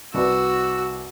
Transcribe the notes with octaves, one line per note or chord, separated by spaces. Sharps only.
C2 F#4 B4 D5 E6